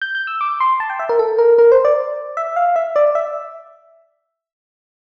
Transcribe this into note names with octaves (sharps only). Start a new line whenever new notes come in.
G6
G6
E6
D6
C6
A5
G5
E5
A#4
A4
A#4
A#4
C5
D5
E5
F5
E5
D5
E5